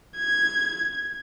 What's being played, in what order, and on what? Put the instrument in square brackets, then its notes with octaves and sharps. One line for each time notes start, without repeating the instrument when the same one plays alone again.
[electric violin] G#6